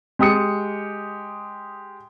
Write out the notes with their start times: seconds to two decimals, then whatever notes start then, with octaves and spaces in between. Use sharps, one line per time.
0.19 G#3 G4 D#6 C#7